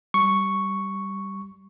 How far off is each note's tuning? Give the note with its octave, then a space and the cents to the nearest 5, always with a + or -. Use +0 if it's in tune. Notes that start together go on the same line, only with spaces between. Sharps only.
G3 +0 C#6 +0